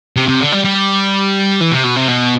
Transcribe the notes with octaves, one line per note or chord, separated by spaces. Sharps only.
C3
C3
D3
G3
G3
E3
C3
B2
C3
B2